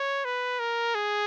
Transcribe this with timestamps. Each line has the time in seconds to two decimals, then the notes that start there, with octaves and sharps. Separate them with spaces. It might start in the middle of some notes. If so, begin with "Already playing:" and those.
Already playing: C#5
0.25 B4
0.60 A#4
0.95 G#4